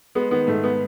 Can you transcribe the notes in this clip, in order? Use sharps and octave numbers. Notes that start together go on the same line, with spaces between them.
G#3 B3
D#3 B3
G#2 A3
B3